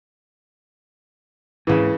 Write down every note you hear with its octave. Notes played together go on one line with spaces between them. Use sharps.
D2 G#2 C#3 E3 A#3